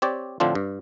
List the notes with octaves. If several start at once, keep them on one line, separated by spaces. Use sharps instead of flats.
C4 G4 C#5 D5
A2 D3 F3 C4 D4 F4
G2